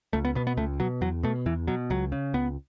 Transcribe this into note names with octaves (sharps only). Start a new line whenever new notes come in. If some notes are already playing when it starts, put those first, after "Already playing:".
C#2 A3
B3
B2 B3
B3
C#2 A3
B2 F#3
E2 F#3
B2 A3
E2 E3
B2 F#3
C#2 F#3
C#3
C#2 B3